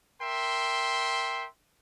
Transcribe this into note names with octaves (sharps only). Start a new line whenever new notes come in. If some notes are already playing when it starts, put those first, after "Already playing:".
A#4 E5 G5 C6